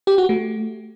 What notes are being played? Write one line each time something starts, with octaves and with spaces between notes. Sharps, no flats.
G4
F#4
A3